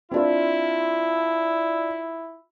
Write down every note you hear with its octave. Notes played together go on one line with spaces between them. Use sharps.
C4 D4 E4 F4